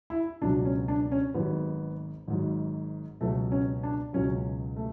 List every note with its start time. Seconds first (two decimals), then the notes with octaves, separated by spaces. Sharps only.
0.10 E4
0.42 C#2 B2 F#3 D4
0.65 C#4
0.88 D4
1.12 C#4
1.34 G#1 G#2 F#3 B3
2.28 G#1 G#2 F#3
3.21 C#2 B2 F#3 A3
3.52 C#4
3.83 D4
4.13 C#2 B2 F#3 C#4
4.76 A3